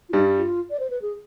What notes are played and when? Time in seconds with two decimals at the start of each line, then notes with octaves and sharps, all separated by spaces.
0.09 F4
0.13 G2 G3 D#4
0.38 F4
0.70 D5
0.80 C5
0.90 B4
1.02 G#4